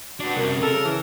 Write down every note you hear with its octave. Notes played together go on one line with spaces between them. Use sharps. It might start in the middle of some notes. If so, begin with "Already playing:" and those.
D4 F#4 B4
C2 F#2 A#4
C#3 A4 A#4
E3